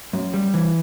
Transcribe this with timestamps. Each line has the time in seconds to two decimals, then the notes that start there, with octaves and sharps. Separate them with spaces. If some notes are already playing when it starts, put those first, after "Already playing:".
0.13 F#2
0.34 G3
0.54 E3